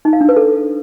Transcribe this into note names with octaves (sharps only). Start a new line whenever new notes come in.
D#4
F5
D4
B4
A4